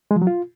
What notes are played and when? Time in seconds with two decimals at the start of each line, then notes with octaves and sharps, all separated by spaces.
0.11 G#3
0.16 F3
0.22 F#3
0.27 F4